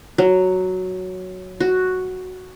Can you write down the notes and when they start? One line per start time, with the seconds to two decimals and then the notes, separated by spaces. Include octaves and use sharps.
0.18 F#3
1.60 F#4